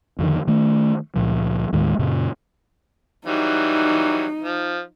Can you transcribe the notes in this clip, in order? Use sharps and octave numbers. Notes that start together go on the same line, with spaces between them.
F2 D3 D#3
D#3 A3
C#2 A#2 F3
D#2 A2 D#3 G#3
F#2 A#2 C#3
E3 F#3 G3 D#4
F3